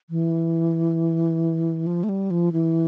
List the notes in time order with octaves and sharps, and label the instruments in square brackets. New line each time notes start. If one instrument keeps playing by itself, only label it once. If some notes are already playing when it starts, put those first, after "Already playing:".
[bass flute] E3
F3
A3
G3
F3
E3